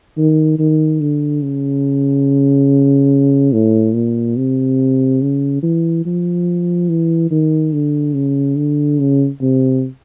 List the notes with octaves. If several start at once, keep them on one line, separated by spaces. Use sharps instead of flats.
D#3
D#3
D3
C#3
A2
A#2
C3
C#3
E3
F3
E3
D#3
D3
C#3
D3
C#3
C3